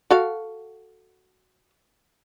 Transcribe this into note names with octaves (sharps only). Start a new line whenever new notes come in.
F#4 A4 F5